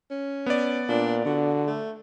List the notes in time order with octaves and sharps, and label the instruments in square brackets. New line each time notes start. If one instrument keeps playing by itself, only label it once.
[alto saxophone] C#4
[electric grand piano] B3 D5
[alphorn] A#2 [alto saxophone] D4
[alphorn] D3 [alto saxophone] F#4
[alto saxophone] A3